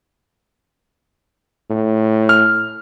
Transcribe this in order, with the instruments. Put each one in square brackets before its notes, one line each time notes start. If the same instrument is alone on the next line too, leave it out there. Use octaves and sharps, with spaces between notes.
[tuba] A2
[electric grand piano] F6